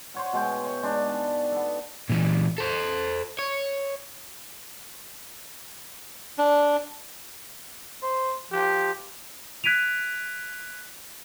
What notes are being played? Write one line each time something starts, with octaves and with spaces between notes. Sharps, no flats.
C5 C#5 F#5
B2 G#3 G5
C#5 E5
G#3 D4 D#4
A5
B3 A4
A#2 E3
A4 C5
C#5
D4
C5
F3 G4
F#6 G#6 B6 D7 D#7 F7